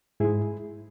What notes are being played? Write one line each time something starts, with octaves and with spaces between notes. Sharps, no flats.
G#2 G#3 E4 G#4